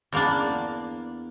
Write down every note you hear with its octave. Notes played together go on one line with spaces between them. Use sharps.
E2 A#3 D4